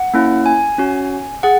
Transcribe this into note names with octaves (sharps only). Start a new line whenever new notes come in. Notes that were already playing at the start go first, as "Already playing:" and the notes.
Already playing: F#5
A#3 C#4 E4
G#5
C#4 F#4
G#4 F#5